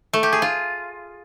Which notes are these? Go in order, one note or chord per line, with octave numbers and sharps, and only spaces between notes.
A3
G4
G#4
F4